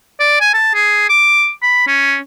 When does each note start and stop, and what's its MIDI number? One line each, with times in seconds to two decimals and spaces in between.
0.20 0.38 74
0.41 0.51 80
0.54 0.71 81
0.74 1.07 68
1.09 1.50 86
1.63 1.83 83
1.87 2.17 61